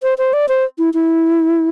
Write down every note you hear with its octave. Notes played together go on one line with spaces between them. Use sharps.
C5
C5
D5
C5
E4
E4